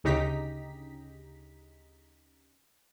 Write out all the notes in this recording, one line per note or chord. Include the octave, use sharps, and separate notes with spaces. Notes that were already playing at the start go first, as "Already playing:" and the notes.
D2 C#3 D#4 G4 A#5 B6